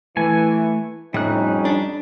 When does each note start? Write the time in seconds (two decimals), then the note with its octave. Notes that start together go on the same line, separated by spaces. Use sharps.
0.17 E3 A3 G#5
1.14 F2 A2 G3 C#4 D#4 F#6
1.65 D4